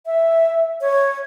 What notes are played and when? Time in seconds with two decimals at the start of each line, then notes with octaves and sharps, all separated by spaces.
0.06 E5
0.81 C#5